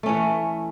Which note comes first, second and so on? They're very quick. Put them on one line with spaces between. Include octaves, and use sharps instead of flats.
A3 C#4 E3